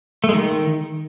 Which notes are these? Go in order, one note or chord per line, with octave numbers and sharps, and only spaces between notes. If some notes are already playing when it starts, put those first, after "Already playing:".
A3
G#3
D#3